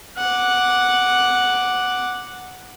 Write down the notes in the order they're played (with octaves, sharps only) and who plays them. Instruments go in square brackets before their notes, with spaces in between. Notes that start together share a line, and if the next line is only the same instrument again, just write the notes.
[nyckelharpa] F#5 D6